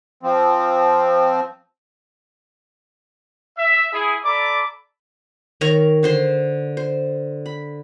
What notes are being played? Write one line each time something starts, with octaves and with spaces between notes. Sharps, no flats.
F3 C4
E5
E4 G#4
A4 D5 A#5 B5 D6
D#3 A#4 C#5 A#5
D3 C5 C6
C5
B5